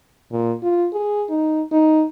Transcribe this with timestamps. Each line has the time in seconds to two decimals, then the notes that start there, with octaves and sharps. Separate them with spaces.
0.32 A#2
0.63 F4
0.93 G#4
1.29 D#4
1.72 D#4